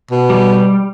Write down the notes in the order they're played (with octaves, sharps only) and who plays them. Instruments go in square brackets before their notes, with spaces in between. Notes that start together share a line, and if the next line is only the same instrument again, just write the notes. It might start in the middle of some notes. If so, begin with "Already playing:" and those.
[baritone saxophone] B2
[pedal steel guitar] G3